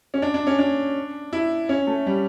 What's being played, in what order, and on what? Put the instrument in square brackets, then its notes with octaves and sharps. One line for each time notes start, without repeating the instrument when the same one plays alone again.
[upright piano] C#4
D4
D4
C#4
D4
E4
C#4
A3
G3